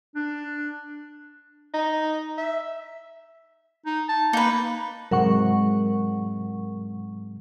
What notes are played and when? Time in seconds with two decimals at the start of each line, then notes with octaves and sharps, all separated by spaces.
0.16 D4
1.74 D#4
2.38 E5
3.86 D#4
4.09 A5
4.33 A#3 D#4 B4
5.11 G#2 C3 F#3 G#3 A#4 F#5 C#6